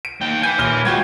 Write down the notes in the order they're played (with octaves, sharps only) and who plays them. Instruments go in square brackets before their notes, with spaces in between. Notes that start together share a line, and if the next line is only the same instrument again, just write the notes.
[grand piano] D7
[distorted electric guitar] D#2 G5
[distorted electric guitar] B4 G#5 [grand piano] G6
[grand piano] D#1 F6 G7
[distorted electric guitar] G#3 F4 [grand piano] F#4 G5 G#6